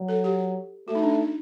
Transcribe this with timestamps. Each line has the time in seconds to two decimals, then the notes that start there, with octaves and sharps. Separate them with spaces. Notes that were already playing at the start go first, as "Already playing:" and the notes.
Already playing: F#3
0.09 A4
0.24 G4
0.88 A3 F#4
0.95 D#4
1.03 D4
1.10 D#4